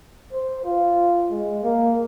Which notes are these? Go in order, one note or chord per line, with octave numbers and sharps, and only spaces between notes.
C5
F4
G#3
A#3